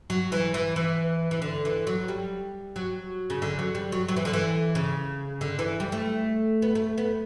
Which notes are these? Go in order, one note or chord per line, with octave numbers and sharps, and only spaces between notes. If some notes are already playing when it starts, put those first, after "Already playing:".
F#3
E3
E3
E3
E3
D3
E3
F#3
G3
F#3
C#3
D3
F#3
G3
F#3
F#3
E3
D3
E3
C#3
D3
E3
G3
A3
B3
A3
B3